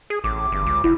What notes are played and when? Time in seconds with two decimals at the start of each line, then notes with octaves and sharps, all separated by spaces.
0.10 G#4
0.24 A1 D6
0.52 G1
0.66 C#2
0.84 F1 E4